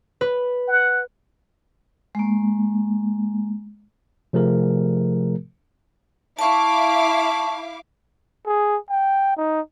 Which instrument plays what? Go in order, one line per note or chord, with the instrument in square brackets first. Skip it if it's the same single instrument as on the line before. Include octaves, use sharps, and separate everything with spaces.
[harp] B4
[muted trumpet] F#5
[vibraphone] G#3 A#3
[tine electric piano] C3 F3 A3 G#4 A#4
[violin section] E4 F5 D6 [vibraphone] A5 C#6
[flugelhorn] G#4
G5
D#4